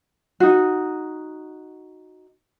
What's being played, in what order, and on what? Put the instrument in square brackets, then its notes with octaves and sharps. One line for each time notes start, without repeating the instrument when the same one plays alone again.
[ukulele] D#4 F#4